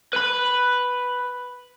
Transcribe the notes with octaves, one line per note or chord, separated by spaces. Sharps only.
B4 B5